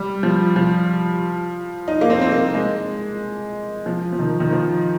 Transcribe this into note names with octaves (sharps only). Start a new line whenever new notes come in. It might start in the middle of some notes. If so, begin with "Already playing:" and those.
Already playing: G3
F3
F3
D#4
A#3
C4
C4
A#3
G#3
F3
F3
D#3
D#3
F3